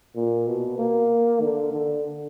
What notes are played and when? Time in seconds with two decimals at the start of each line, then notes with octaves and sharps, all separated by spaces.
0.16 A#2
0.47 B2
0.78 A#3
1.42 D3
1.72 D3